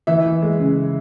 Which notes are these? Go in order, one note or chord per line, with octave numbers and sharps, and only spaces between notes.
E3 E5
E3
G#3
C#3